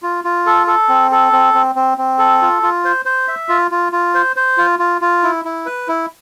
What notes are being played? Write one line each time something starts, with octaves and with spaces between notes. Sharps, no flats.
F4
F4
A4
A4
C4
A4
C4
C4
C4
C4
A4
F4
F4
C5
C5
E5
F4
F4
F4
C5
C5
F4
F4
F4
E4
E4
B4
E4